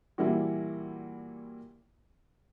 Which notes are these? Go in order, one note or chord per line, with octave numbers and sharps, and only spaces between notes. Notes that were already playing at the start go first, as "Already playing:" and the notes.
A#2 E3 G3 A#3 E4 F#4